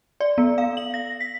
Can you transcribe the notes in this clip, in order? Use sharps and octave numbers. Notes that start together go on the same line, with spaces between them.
D5
B3
F5
F#7
A#6
B6